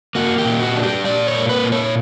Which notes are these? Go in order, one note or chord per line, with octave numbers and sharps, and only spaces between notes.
A#3 F#4
G4
A#2
F#4
D4
G4
A#2 D5
C#5
A#3
B4
A#2
C#5